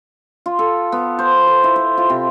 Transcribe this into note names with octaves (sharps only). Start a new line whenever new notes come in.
F4
A4
B3
C5
A4
E4
C5
F4
C3